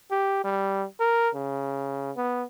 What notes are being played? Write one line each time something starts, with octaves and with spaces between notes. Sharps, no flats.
G4
G3
A#4
C#3
B3